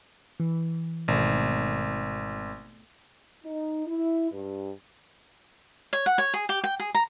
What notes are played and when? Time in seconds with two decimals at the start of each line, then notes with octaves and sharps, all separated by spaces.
0.40 E3
1.08 G#1 B2 A3
3.44 D#4
3.87 E4
4.32 G2
5.93 C#5
6.06 F#5
6.18 C#5
6.34 G#4
6.49 G4
6.64 G5
6.80 G#4
6.95 A#5